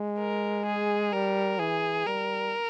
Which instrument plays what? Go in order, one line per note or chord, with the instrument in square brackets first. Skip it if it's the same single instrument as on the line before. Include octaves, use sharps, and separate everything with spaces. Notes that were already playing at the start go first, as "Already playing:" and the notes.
Already playing: [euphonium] G#3
[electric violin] A#4
G#4
[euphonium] G3 [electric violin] A#4
[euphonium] E3 [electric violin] G#4
[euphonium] G3 [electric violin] A#4